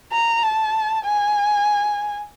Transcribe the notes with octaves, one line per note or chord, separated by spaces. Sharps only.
A#5
A5
G#5